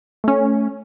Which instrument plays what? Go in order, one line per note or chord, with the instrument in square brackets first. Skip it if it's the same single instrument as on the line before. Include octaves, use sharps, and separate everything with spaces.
[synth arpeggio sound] A3 C#4